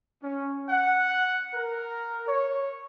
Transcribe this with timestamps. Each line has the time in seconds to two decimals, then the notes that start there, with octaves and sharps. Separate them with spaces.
0.23 C#4
0.70 F#5
1.54 A#4
2.26 C#5